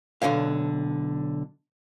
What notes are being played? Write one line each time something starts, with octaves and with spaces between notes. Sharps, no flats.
B1 D3 F3 C#5 F5